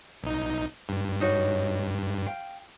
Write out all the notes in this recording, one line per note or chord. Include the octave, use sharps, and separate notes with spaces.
B1 D#4
G2
D#4 F#4 C#5
F5 G5